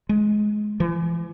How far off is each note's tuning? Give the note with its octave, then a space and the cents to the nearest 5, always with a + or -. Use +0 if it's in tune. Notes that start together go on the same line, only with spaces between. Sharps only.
G#3 +20
E3 +40